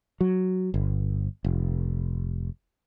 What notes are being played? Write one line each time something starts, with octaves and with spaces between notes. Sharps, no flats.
F#3
G1
F1